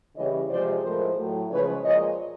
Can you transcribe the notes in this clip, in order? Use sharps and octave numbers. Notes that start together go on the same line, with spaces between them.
C#3 E3 G3 C#5 D#5
C3 F3 G#3 C5 D5
A2 F3 G#3 A#4 C5
A2 F#3
C#3 F3 G#3 B4 C#5
A#2 F3 G#3 C#5 D#5